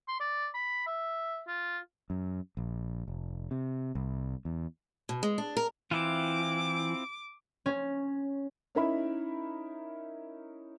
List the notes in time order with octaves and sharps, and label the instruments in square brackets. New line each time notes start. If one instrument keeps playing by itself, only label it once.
[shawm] C6
D5
B5
E5
F4
[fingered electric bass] F#2
A#1
F1
C3
C2
E2
[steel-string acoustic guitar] B2
G#3
D4
A#4
[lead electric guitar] E3 [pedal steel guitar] C4 E4 F4 [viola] D6
[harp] C#4
[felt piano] C#4 D#4 E4 A#4 E5 B5